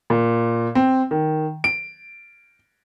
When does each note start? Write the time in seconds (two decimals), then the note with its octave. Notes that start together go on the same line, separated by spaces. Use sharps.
0.10 A#2
0.75 C4
1.11 D#3
1.64 D7